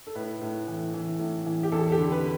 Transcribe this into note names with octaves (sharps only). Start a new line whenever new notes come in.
A4
A2 B4
A2
E3
E3
A2
E3
G4
E2 A4
A4
G4
D3
B4